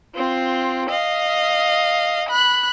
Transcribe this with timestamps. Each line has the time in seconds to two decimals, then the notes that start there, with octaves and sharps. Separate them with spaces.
0.15 C4 F4
0.89 D#5 F5
2.29 B5 F#6